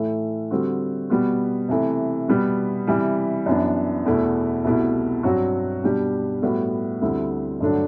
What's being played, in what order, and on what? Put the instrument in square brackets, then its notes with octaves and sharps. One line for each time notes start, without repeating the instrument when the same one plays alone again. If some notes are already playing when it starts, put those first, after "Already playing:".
Already playing: [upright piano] A2 E3 A3
D3 G3 C4 F#4
B2 G3 B3 F#4
C3 E3 A3
B2 G3 B3
C3 E3 G3
F#2 E3 B3 D4
E2 B2 A3 E4
C2 B2 A3 E4
G2 F#3 C4 F#4
B2 G3 D4 G4
A2 G3 B3 F#4
D2 D3 G3 C4 E4
G2 D3 F#3 A3 D4